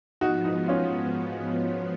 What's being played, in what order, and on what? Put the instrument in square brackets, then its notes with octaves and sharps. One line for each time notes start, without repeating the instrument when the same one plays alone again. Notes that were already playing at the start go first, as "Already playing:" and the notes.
[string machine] G#2 F3 B3 [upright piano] D#4 F#4
[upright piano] D#4
C#4 F4